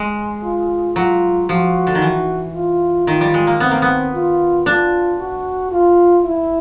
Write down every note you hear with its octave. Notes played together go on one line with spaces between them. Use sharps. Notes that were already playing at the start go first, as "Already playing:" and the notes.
Already playing: G#3
F4
F#3 F4
F3 F#4
D3
D#3
E3
F4
D#3 F4
G3
G#3
A#3
B3 C4
A#3
B3
F4
D4 F4
F#4
F4
E4